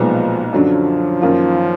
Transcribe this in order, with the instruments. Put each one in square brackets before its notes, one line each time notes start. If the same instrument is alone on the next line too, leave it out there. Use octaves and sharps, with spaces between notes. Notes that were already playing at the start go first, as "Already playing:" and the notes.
Already playing: [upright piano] B1 A#2 G#3 B3 [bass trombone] F3
[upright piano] F#2 D3 F#3 D4 [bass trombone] F3
[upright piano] F#2 D#3 A#3 F4